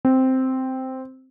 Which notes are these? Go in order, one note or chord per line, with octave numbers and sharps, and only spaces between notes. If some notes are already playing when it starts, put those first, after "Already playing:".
C4